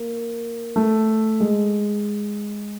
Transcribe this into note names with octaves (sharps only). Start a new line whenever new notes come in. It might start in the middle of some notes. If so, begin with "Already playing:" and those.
Already playing: A#3
A3
G#3